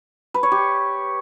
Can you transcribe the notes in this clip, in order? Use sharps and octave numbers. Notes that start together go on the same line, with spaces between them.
B4
C#5
G4